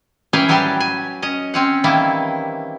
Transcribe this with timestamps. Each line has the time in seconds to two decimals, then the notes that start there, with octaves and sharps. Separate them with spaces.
0.33 E3 C#4 G#4 A#4 B4 G5
0.48 A2 F#3 G3 G4 G#5 A5
0.80 G#5
1.22 C#4 D#5
1.54 C4 C#4 F#5
1.84 D#3 E3 G3 A#3 E4